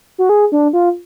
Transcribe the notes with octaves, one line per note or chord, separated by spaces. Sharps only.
F#4
G#4
D4
F4